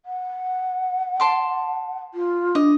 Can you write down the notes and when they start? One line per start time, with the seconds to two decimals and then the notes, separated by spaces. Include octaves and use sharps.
0.06 F#5
1.20 A5 C6 D6
2.14 F4
2.55 D4 D#5